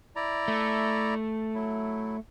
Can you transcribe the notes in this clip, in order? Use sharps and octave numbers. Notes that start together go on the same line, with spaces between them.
E4 D5 A#5
A3
F#3 E4